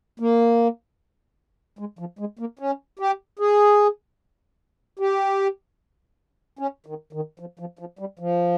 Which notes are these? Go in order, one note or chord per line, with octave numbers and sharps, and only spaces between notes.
A#3
G#3
F3
G#3
A#3
C#4
G4
G#4
G4
C#4
D#3
D#3
F3
F3
F3
G3
F3